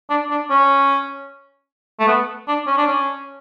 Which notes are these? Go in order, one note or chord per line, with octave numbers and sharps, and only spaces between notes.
D4
D4
C#4
A3
B3
D4
C#4
D4
C#4